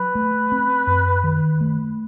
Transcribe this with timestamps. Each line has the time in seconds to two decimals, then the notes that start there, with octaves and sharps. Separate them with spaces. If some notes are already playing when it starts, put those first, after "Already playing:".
Already playing: F#3 B4
0.15 A3
0.52 C4
0.87 F#2
1.24 D#3
1.61 A3